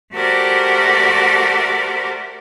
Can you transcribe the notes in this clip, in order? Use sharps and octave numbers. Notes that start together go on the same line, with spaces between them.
A3 F#4 G4 A#4 C5 D5